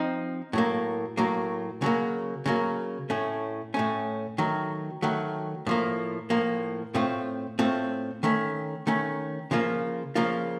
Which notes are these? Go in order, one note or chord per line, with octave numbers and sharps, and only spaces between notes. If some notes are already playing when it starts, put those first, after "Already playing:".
Already playing: F3 C4 D#4
A2 F#3 A#3
A2 F#3 A#3
C#3 F#3 A#3
C#3 F#3 A#3
A2 A3 C#4
A2 A3 C#4
D#3 F#3 A3
D#3 F#3 A3
A2 F3 A#3
A2 F3 A#3
A2 A3 C4 F4
A2 A3 C4 F4
D#3 A3 C#4
D#3 A3 C#4
C#3 F3 A#3 F4
C#3 F3 A#3 F4